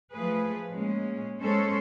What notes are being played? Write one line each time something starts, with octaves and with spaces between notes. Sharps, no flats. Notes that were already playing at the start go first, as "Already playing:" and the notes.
F3 A3 G#4 B4
A#2 G#3 C#4
G#3 C#4 A4 C5 C#5